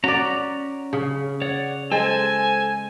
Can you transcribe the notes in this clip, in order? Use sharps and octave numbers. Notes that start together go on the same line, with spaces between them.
C#4 F#4 D5 A#5
C#3
C#5 D5 F#5
G#3 A4 C5 G#5 A5